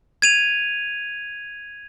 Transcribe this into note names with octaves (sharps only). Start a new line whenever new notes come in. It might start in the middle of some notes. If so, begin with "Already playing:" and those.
G#6 D#7 F7